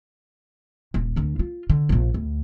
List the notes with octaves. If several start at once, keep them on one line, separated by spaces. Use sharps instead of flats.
D#1
D2 D3
F4
D3
D#1 A#1
D2